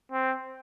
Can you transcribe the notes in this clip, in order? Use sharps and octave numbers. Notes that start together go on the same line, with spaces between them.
C4